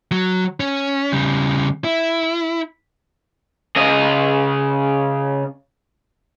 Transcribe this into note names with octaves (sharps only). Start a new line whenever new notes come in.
F#3
C#4
C#3 G3
E4
C#3 D#5